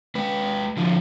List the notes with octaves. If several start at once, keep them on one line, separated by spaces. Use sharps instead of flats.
G#3 B4
D3 F3 E4